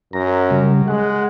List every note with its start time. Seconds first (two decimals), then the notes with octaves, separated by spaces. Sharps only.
0.13 F#2 A#5
0.51 C#3 G3
0.88 G#3 F#5